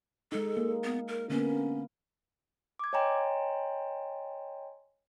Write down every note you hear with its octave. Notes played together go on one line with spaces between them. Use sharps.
G#3 D#4 A4
A#3
B3
A#4
D3 A#3 B3 C#4
D6 G#6
C#5 D#5 G5 G#5 A#5 C6